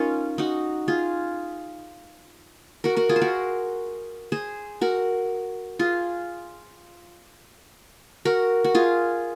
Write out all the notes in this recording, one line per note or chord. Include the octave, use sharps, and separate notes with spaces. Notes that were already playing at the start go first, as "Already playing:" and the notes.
Already playing: C#4 D#4 F4 A#4
D#4 F#4
F4 G#4
F#4 A#4
F#4 A#4
F4 G#4
C5
F#4 A#4
G#4 C5
F#4 A#4
F4 G#4
F#4 A#4
F#4
F4 G#4